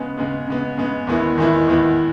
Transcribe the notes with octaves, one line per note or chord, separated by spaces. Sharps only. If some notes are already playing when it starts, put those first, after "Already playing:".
Already playing: C#3 G#3 B3
C#3 G#3 B3
C#3 G#3 B3
C#3 G#3 B3
E2 D#3 G#3 B3 E4
E2 D#3 G#3 B3 E4
E2 D#3 G#3 B3 E4